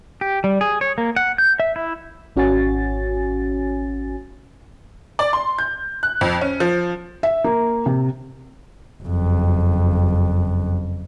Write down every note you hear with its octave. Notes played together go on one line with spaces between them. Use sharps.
G4
G3
G#4
C#5
A#3
F#5
G6
E5
E4
G#1 C#4 F#4 C#5 G#5 A6
D5
C6
G6
F#6
F2
C#4
F3
E5
A#3
C3
F#1 F2